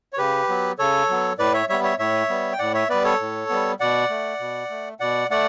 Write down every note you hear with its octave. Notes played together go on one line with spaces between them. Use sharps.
C#5
C#3 G4 B4
F#3 B3
C#3 A4 C#5
F#3 B3
A2 B4 D5
C#5 E5
G3 B3 C#5 E5
C#5 E5
A2 C#5 E5
G3 B3
G5
A2 D5 F#5
C#5 E5
G3 B3 B4 D5
A4 C#5
A2
G3 B3
B2 D5 F#5
A3
B2
A3
B2 D5 F#5
A3 D5 F#5